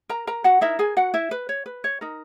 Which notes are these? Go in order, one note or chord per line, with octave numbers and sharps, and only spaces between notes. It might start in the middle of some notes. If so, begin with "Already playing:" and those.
A#4 A#5
A#4 A#5
F#4 F#5
D#4 E4 A#4 E5
G#4 G#5
F#4 F#5
E4 E5
B4
C#5
B4
C#5
D#4 A#4